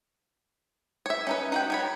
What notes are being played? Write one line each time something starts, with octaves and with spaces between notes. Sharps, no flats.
C#5 E5
C#4 D#4 B4
D#4 F#4 G5
D#3 C#5 B5